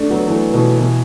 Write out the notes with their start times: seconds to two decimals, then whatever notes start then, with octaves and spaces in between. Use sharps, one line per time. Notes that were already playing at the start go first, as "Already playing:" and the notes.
Already playing: A3 D4
0.10 F#3 B3
0.27 E3 A3
0.53 B2 E3
0.79 B2 E3